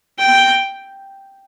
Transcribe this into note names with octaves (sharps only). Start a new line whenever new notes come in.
G5